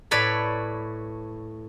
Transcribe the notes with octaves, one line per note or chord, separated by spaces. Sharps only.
A2 B4 C#5 D5 B5